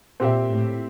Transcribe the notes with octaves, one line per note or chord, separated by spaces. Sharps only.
A#2 C4 G4 C5 E5
A2